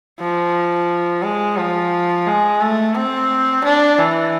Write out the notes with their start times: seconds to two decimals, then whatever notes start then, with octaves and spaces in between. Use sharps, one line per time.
0.20 F3
1.23 G#3
1.57 F3
2.26 G#3
2.61 A3
2.95 C4
3.64 D4
3.99 E3